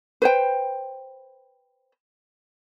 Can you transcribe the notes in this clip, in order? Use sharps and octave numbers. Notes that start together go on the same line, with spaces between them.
B4 C5 G5